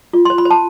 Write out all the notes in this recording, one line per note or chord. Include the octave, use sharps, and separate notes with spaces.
F4
C6
C5
B5
C5
A5